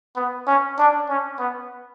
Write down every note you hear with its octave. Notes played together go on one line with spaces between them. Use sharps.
B3
C#4
D4
C#4
B3